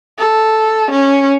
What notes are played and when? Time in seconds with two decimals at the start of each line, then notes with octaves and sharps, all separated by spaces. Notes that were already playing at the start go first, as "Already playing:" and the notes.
0.19 A4
0.91 C#4